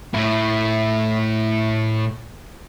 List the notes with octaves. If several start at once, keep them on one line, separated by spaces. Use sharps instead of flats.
A2 E4